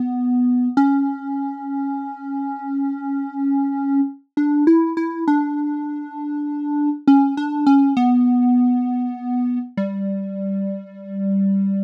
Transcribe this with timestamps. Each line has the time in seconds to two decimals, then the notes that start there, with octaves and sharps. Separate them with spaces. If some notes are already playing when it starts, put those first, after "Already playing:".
Already playing: B3
0.77 C#4
4.37 D4
4.67 E4
4.97 E4
5.28 D4
7.07 C#4
7.37 D4
7.67 C#4
7.97 B3
9.77 G3